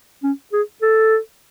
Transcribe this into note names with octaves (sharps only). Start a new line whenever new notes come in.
C#4
G#4
A4